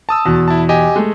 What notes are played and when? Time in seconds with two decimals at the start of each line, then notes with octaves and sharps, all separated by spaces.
0.09 A5 D#6 E6
0.25 E2 B2
0.48 E4 A5
0.69 G4 D#5 G#5
0.96 G#3 A3